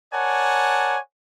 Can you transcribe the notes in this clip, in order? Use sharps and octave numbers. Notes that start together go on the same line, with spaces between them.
A#4 C#5 D5 F#5 G#5 A5